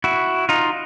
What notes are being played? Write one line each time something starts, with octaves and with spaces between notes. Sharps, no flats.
E4 F#4
D#4 F4